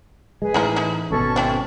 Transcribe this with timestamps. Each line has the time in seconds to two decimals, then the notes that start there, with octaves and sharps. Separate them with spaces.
0.42 G#3 G#4 B4
0.54 A2 E3 D#4 E4 A#4
0.76 D#4 E4
1.10 G#1 B2 C#4 A4 C#6
1.36 C4 C#4 E4 A4